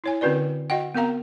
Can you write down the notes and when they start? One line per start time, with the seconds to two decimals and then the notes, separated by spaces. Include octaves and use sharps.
0.04 E4 C#5 G#5
0.21 D3 C4 C#4 F#4 B4 D5
0.70 F#4 D#5 F#5 G5
0.94 B3 C4 A#4 F5 A#5